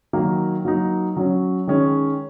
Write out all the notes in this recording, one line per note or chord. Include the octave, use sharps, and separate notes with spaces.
D#3 F#3 A#3
F#3 A#3 D#4
F#3 C#4
D#3 G#3 C#4